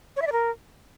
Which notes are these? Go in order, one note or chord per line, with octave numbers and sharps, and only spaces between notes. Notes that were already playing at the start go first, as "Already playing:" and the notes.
C#5
E5
D5
A#4